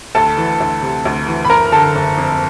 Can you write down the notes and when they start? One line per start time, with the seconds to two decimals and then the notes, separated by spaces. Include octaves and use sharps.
0.15 D2 A4 A5
0.37 E3
0.61 D2
0.82 C3
1.05 D2
1.27 E3
1.45 B5
1.50 F#1 A#4 A#5
1.72 D3 A4 A5
1.95 F#1
2.17 F2